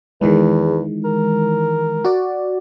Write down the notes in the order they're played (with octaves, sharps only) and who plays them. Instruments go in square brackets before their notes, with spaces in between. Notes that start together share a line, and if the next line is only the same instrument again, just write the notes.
[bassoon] E2 [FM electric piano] D#3 E3 G#3
[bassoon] A#4
[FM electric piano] F#4 D5